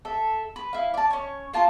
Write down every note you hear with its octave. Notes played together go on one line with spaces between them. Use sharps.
A4 E5
B4
E4 F5
D5 A5
C#4 C#5
A#3 F4 A5